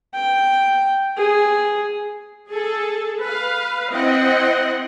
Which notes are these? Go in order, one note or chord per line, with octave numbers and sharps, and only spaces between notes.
G5
G#4
G#4 A4 A5
B4 F5
C4 E4 D#5 F#5